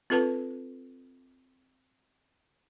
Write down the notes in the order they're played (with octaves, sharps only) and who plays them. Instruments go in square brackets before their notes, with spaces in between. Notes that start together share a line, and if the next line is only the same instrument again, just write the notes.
[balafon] C4 F4 A4 B4 A5